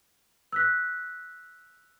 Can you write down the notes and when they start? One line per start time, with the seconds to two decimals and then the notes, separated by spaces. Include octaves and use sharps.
0.52 E6 F#6 B6